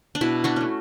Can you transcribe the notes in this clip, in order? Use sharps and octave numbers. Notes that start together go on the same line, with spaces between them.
D4
B2 E4
D4 F#4
A3 C#4